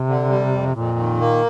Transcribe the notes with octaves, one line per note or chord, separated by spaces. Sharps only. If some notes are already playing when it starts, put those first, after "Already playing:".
Already playing: C3
D3
G3
F2
F2 A#2
D#3
A#3